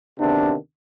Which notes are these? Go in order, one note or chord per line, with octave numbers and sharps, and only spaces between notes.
D2 C3 D#3 B3 D4